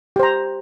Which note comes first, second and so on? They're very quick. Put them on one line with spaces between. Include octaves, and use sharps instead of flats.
G4 C5 A#5